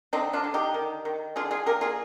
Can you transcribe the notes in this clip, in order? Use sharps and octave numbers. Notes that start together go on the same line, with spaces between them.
D3 C4 D#4
D4 F4
D3
D#4 G4
D#3
D#3
D3 F4 G#4
F4 G#4
A#3 G4 A#4
F4 G#4